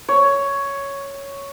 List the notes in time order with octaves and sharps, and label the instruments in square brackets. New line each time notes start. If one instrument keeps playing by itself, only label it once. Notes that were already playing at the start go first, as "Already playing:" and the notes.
[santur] C#5